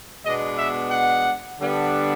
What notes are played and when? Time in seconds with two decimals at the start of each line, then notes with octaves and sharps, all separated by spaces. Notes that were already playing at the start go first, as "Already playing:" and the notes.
0.24 B2 G#3 B3 D4 D#5
0.57 E5
0.91 F#5
1.59 D3 G3 B3 D4